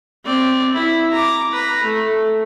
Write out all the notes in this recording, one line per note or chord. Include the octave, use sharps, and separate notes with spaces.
C4 D5
E4
A#5 D6
B4 A#5
A3